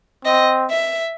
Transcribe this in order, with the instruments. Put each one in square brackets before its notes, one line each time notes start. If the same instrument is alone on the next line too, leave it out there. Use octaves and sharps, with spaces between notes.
[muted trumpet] C4 [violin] D#5
[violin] E5